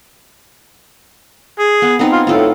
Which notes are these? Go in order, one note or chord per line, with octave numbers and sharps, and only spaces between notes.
G#4
B3
B3 C4 D#4
F4
A2 F4 A4